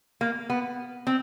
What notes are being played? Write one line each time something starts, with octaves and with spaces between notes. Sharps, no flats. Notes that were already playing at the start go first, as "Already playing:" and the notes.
A#3
B3
C4